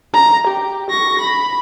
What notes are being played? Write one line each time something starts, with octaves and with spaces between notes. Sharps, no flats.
A#5
G4
C#6 A#6
B5